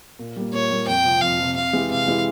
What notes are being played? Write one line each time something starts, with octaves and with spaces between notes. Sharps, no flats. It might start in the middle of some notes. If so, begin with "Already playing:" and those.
A#2
G3 A#3
A#2 C#5
G3 A#3
F2 G5
C3 F3
F2 F5
C3 F3
C3 F5
E3 G#3 E4 G4
C3 F5
E3 G#3 E4 G4